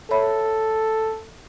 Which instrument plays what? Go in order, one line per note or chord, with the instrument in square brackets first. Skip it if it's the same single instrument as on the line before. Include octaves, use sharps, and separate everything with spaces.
[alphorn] A4 [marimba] C#5 E5 B5